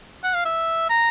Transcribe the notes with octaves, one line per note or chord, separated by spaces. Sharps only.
F#5
F5
E5
A#5